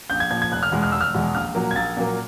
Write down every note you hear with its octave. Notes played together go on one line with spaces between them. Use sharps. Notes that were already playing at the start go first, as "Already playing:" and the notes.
A#1 G6
G#6
A#2 F3 G#6
G#6
F1 F#6
F6
E2 B2 G#3
F6
F1 E6
F6
E2 B2 G#3
A#1 F6
A#2 F#3 A#3
G#6
A#1 A6
A#2 F#3 A#3